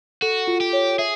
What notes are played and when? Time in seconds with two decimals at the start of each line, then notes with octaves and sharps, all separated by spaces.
0.22 F#4 A4
0.48 F4
0.60 G4
0.73 C#5
0.99 G#4 E5